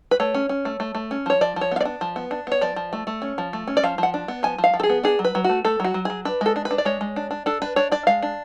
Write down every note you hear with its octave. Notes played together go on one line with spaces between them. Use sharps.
B4
A3 C#5
C#4
C#4
A3
A3
A3
C#4
F3 C#5
F3 D5
F3
C#5
B3 F5
D5
D4
F3
B3
D4
B3 C#5
F3 D5
F3
A3
A3
C#4
F3
A3
C#4
D5
F3 F5
F3 F#5
D4
B3
F3 G#5
F3
F5
F3
A4
G#4
B3
D4 G#4
F#3
B4
F#3
A3 F#4
A3 A4
F#3 F#4
F#3
F#3 G#4
D4 B4
G#3 A4
D4
B4
D4
D5
G#3 C#5
G#3
D4
D4
D4 A4
D4 B4
D4 C#5
D4 D5
G#3 F5
D4